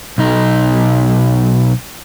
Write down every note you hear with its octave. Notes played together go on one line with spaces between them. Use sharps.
B1 D#4